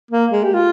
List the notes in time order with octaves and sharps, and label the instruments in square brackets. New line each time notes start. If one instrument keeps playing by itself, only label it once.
[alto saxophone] A#3
G#3
G4
F4